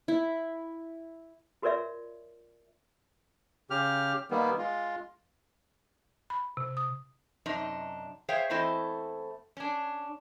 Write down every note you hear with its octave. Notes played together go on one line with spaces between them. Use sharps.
E4
F4 F#4 A#4 C#5 D5 E5
C#3 G4 F6
D#3 G3 A#3 B3
G#3 F4
B5
C3
D#6
F#2 C3 D4 D#4
G#4 C5 C#5 E5 F5 G5
E2 A3 C4 E4 C5 D#5
C#4 D4